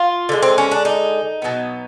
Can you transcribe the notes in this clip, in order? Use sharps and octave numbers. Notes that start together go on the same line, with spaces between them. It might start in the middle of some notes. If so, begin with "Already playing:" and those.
Already playing: F4
D3 F3 G#3
C4
C#4
D4
D#4
B2 F#3 B3